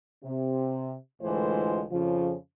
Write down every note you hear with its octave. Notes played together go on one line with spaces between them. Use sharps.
C3
D2 A2 E3 G#3 F4 C5
F2 C#3 F3